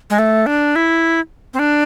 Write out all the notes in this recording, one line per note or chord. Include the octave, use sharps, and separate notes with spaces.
G#3
A3
D4
E4
C4
D4